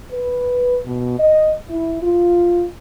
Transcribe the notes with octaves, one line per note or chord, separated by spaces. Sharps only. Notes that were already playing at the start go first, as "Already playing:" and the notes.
B4
B2
D#5
E4
F4